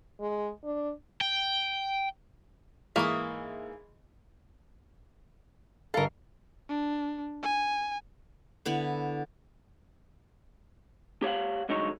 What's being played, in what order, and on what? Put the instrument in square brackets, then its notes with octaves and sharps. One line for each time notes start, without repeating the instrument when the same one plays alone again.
[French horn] G#3
D4
[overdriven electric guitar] G5
[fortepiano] G#2 E3 [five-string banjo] A#3 [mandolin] E5 C#6 D#6
[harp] G1 F5 [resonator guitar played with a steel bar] A4 A#4
[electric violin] D4
G#5
[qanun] D3 B3 E4 B5
[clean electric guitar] G4 C#5 F5 F#5
C2 D3 F#3 G#3 D#4 C#5